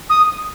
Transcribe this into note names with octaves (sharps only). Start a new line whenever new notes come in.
D#6